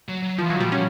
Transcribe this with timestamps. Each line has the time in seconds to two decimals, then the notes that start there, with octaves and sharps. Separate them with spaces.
0.08 F#3
0.23 F#3
0.38 E3 F3
0.50 F#3
0.60 A#2 G3
0.72 C#4